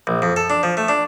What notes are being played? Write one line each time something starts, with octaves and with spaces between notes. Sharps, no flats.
A#1
F2
A4
D4
F3
A3
D4